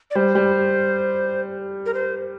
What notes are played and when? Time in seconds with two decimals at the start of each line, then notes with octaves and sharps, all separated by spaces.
0.11 D5
0.15 G3 C5
0.35 G3
1.86 A#4
1.94 C5